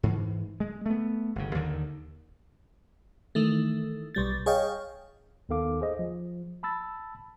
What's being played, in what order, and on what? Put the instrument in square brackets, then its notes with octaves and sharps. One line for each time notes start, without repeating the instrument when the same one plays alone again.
[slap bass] G#2 E3
G#3
A3 B3
G1 C#3
D#2 D3 D#3
[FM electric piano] D#3 E3 A3
B1 G3 A6
G#4 C#5 D#5 F5 G5
[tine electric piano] D#2 D#3 B3 A4 F5 D6
G#4 C5 D#5
F3
A5 B5 E6 A6